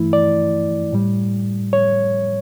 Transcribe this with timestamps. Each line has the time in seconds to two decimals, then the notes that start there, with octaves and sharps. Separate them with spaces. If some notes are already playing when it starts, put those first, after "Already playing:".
Already playing: G2 E3 A3 E4
0.13 D5
0.92 A2 G3
1.73 C#5